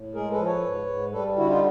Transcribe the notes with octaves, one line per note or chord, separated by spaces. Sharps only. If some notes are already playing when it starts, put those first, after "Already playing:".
Already playing: A2
G#3 G#4 A#4
A4 B4
F3
B4 C#5
G#2
G#2
G3 A4 B4
D3 E4 F#4
D#4 F4